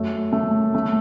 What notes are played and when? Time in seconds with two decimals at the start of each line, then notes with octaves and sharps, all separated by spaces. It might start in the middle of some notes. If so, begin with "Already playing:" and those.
Already playing: F#2 A3
0.33 A3
0.75 A3